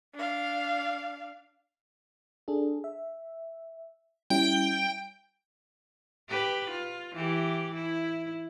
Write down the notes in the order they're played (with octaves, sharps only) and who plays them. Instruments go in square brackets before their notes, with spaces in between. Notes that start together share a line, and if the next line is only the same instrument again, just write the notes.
[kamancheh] D4 F5
[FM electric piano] D4 G#4 A4
E5
[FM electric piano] G3 C#4 E4 [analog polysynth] G5
[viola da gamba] G4 B4
F4
E3 G4
E4